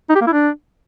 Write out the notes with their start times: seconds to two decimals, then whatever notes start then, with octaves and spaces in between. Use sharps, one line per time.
0.10 D#4
0.15 G4
0.21 A#3
0.27 E4
0.33 D4